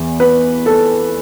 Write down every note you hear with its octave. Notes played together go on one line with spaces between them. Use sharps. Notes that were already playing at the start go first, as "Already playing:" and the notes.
Already playing: E2 E3
B4
A4